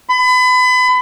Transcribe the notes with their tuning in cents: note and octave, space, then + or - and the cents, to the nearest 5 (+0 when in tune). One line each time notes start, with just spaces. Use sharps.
B5 +30